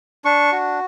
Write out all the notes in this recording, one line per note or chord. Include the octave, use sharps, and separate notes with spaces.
D4 C#6
F#4